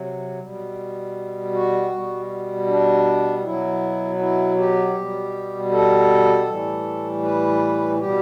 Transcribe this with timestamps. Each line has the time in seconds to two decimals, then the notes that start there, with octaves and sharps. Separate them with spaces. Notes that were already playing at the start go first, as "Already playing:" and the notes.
Already playing: C3 F#3
0.39 B2 G3
1.53 F#4
1.91 B2 G3
2.67 D4
3.43 B2 F#3 E4
4.19 E4
4.57 G4
4.95 B2 G3
5.71 A4
6.47 A2 E3 G3
7.23 B4
7.99 B2 G3 G4